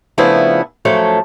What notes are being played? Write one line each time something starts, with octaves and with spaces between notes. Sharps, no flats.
C#3 F3 A3 B3 D4 E4
F#2 F3 A3 A4 C#5